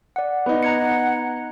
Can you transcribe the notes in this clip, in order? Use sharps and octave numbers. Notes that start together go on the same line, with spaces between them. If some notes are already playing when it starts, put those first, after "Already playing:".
D5 F#5
B3 D#4
F#5 A#5 G#6 C#7